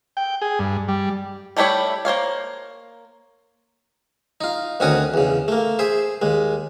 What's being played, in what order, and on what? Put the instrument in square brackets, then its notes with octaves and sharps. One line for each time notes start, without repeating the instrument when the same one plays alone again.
[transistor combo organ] G5
G#4
G2
G3
[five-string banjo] G3 A3 E4 G4 C#5
A#3 C5 C#5 F5
[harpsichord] D#4 F4
D2 D#3 C4 C#4 F#4 D#6
E2 C#3
A3 A#3
G#4 C5 E5
D#2 G#3